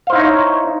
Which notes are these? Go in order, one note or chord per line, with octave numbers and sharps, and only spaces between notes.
D#4 E4 C5 C#5 F5